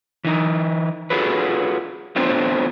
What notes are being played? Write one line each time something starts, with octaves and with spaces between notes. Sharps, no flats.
E3 D#4
F4 F#4 G#4 A4 B4
A3 B3 C4 D4 F4 C5